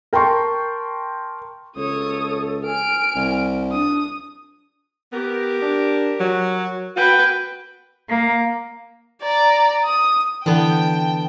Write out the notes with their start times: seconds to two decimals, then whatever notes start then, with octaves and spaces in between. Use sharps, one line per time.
0.13 A#4 G5 A5 C6 C#6
1.76 C#2 A4 C#5 D#6
2.66 G#5 F6 D7
3.16 C2
3.72 D4 D#6
5.12 B3 G4 A#4
5.62 D4
6.20 F#3
6.96 F#4 B4 G5
8.07 A#3
9.22 D5 A#5
9.84 D#6
10.46 D3 E3 B3 G5 A5